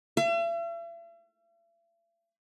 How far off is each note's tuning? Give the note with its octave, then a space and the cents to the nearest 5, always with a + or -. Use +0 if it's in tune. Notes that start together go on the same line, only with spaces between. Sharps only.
E5 +45